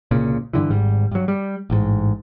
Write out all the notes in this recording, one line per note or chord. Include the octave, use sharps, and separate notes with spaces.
C2 A#2 C#3
G2 D3 E3
G#1 G#2 G3
G2 F#3
G3
A1 G#2